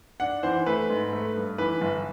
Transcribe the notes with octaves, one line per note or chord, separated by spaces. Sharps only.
D4 F#5
E3 C5
A3 B4
G#2
A3
G2
E3 B4
G1